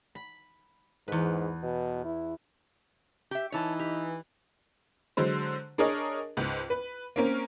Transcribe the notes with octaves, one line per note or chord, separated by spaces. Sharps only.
B5
E2 G#2 B4
B2
E4
G4 E5
E3 D#4 C#5 A5
G4
D3 F#3 G#3 C5
D4 G#4 A#4 C#5 D#5
C#2 G#2
B4
A#3 C4 C#4 A#4